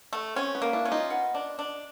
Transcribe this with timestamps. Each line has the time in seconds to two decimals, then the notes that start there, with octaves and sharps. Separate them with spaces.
0.13 A3
0.36 C4 C#4
0.55 B3
0.62 A#3
0.73 D4 E4
0.85 C#4
0.92 D#4 F4
1.10 B3
1.34 D4
1.59 D4